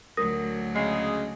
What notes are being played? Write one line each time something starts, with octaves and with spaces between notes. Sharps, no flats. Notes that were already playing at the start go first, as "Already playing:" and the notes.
D2 F#3 A#4 D#6 A#6
C#3 G#3 C7